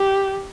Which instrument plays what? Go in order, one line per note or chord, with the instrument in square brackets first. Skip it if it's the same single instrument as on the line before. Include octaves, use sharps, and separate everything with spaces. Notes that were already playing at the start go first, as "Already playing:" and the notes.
Already playing: [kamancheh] G4